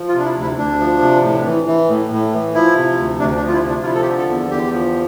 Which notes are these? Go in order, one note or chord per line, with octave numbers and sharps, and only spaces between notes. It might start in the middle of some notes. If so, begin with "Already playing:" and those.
Already playing: F3
F4
C3 D4
E4
D2
E4
D2 D4
F3
C3
A2
E3
E3
A2
A2
E3
F3 E4
C3
D2
D2 D4
D4
F3
F4
E4
C3
D4
F4
F3 E4
A4
G4
D3
A4
E2
E2 G4
F3